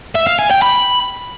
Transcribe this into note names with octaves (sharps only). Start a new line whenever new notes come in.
E5
F5
G#5
G5
B5